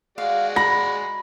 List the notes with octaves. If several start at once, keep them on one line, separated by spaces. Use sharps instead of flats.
G#3 F#4 D5 F5
A#5 B5 A#6